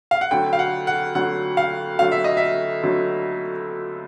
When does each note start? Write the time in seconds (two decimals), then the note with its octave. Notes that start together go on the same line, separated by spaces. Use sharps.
0.11 F5
0.21 F#5
0.31 D2 D3 F#3 G5
0.53 F5
0.59 F#5
0.87 F#5
1.15 D2 D3 F#3 F#5
1.57 F5
1.99 D2 D3 F#3 F5
2.12 E5
2.24 D#5
2.37 E5
2.83 D2 D3 F#3